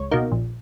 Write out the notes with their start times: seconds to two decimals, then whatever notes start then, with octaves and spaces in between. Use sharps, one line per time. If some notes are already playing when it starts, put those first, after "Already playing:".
Already playing: C#2 C#5
0.11 B2 A#3 D#4
0.32 A#1